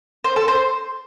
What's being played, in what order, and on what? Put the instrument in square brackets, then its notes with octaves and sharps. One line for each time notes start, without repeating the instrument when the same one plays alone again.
[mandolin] C5
A4
C5